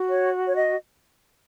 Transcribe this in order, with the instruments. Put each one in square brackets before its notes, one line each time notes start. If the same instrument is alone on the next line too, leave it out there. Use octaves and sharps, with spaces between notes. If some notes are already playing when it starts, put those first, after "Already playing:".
Already playing: [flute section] F#4
C#5
C#5
D#5